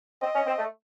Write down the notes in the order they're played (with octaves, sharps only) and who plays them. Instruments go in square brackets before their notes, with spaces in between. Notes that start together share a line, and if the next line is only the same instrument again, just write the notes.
[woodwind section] C4 [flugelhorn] D#5
[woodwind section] C#4
C4
A3